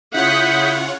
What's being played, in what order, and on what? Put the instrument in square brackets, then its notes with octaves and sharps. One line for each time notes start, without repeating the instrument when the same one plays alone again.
[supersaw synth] C#3 F4 C#5 [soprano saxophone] E4 [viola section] F#5 [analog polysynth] D#6 G6 B6